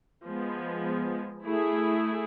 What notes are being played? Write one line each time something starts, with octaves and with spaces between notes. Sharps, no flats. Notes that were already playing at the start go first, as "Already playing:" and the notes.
F3 G#3 B3
A3 E4 G#4